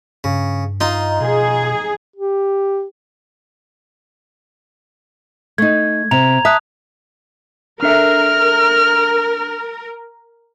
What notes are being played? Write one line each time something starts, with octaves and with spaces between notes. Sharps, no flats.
G2 C#3
D#4 F4 C6
B2 G#4
G4
A3 D#4 G#6
C3 A#5 F7
E5 A5 D#6 F#6
D4 A4 A#4 E5 F6